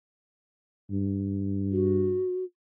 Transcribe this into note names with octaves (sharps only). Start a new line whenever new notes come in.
G2
F#4